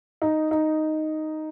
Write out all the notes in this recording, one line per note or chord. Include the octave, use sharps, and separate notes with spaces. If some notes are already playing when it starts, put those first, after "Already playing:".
D#4
D#4